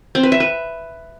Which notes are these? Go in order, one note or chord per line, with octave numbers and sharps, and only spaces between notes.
C4
B4
E5
B4